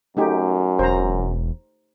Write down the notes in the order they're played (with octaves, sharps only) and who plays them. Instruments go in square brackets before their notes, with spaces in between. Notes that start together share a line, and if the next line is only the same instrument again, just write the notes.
[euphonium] F#2 [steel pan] A3 D#4 G4
[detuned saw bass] E1 [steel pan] C5 A#5